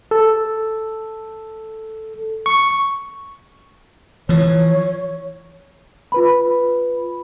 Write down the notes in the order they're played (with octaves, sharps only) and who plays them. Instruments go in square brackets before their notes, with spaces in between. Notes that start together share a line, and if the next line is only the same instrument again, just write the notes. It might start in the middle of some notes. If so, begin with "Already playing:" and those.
[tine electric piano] A4
C#6
[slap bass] E3 F3 [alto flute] C#5
[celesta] F4 B4 B5